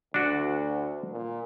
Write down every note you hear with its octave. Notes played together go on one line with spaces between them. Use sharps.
D2 D4 F#4
A#2